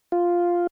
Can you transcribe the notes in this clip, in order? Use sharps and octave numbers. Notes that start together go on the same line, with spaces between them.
F4